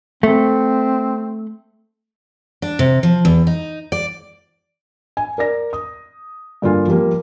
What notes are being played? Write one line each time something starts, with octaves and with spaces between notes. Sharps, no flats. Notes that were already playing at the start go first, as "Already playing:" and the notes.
A3 C4
D4
C3
F3
E2
D#4
D5
G#5
A#4 D5 A#6
D#6
G2 D3 A#3 F4 G#5
F3 G3 A#3